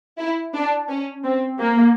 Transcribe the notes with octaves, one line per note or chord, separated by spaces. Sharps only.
E4
D4
C#4
C4
A#3